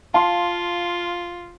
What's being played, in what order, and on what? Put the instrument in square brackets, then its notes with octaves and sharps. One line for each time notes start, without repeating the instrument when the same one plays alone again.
[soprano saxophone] F4 [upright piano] F5 C6 [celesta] A5